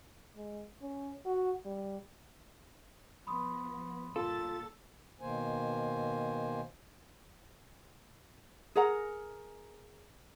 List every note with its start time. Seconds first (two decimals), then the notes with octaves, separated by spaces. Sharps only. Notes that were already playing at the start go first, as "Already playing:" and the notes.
0.36 G#3
0.82 C#4
1.26 F#4
1.65 G3
3.27 F3 B3 B5 C6 D#6
4.16 G1 A#2 F4 A4 A6
5.21 B2 D#3 A#3 C5 G#5
8.76 G#4 A#4 F#5 A#5